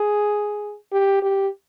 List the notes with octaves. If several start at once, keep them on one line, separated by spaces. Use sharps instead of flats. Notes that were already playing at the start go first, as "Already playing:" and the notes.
Already playing: G#4
G4
G4